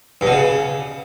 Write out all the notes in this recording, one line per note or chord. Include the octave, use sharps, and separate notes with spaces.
G2
B2
C#3